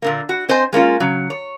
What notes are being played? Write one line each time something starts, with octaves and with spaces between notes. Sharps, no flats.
A#2 D3 A#3
F#4
C4 C5 D#5 G#5
G#3 A#3 C#4 F4
C#3 F#3
C#5